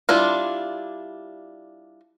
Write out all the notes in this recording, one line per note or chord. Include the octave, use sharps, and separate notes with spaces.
G3 D4 E4 F4